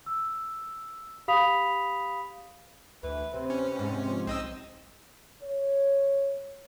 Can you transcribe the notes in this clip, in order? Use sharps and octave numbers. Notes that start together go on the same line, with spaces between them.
E6
G4 F5 B5 D#6 B6 F7
D2 E3 B4
C3 C4 B4
C#4
G#2 C3
F3
B1 C4 D#4 D#5 E6
C#5